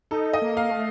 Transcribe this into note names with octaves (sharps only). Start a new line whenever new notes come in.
D#4 A4
D#5
A#3
F5
A3